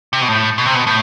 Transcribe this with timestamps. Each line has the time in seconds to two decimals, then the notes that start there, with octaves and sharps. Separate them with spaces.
0.13 C3
0.21 B2
0.28 A2
0.58 B2
0.66 C3
0.74 B2
0.87 A2